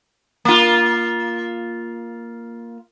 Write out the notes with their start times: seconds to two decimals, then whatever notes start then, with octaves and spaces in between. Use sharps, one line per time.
0.45 A#3 F4